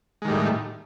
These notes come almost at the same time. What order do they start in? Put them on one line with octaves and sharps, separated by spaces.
G#3 D#3 G3 A2